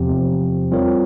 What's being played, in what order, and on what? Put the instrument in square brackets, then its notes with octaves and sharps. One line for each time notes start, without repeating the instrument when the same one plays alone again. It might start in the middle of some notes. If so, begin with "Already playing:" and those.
Already playing: [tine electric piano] E2 C3 F3 C4 G4
G3 C4 F4 A#4 C#5